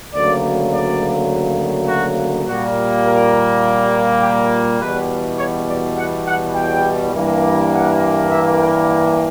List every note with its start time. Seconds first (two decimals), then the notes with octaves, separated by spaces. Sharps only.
0.13 D2 C#3 F#3 A#3 D5
0.72 D5
1.88 F#4
2.47 A#2 G3 A#3 F#4
3.06 A#4
4.22 G4
4.80 E2 B2 G3 B4
5.39 C#5
5.68 D5
5.98 F#5
6.27 F#5
6.55 G5
7.14 G2 E3 A#3
7.73 F#5
8.30 E5
8.60 G5
8.88 F#5